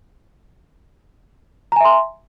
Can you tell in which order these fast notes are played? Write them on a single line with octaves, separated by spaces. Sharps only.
A#5 G#5 E5 C6